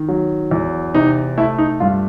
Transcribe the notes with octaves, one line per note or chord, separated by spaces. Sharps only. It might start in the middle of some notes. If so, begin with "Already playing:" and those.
Already playing: D#3
F#3
E2
C3 D#4
A3 E4
D#4
G2 F4